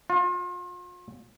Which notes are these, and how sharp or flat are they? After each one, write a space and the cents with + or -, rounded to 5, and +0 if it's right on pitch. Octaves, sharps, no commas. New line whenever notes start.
F4 +35